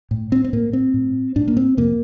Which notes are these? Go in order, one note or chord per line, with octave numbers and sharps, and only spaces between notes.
A2
C4
C4
A2 A#3
C4
A2
A2 D4
A#3
C4
F2 C3 A#3